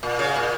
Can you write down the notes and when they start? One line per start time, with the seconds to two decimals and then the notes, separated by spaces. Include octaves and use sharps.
0.03 A#2
0.19 C#3
0.36 A#2